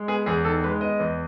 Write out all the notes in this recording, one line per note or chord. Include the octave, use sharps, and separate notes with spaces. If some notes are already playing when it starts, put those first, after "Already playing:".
Already playing: G#3
B3 G#4
E2 G#4
D#3 A4
G#3 B4
B3 D#5
E2